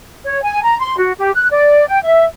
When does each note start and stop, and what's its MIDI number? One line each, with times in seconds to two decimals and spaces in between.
0.24 0.41 73
0.42 0.63 80
0.63 0.77 82
0.79 0.97 84
0.98 1.12 66
1.18 1.32 67
1.34 1.47 90
1.51 1.87 74
1.88 1.99 79
2.04 2.24 76